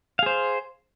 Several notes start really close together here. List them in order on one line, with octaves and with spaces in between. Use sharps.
F5 G#4 C5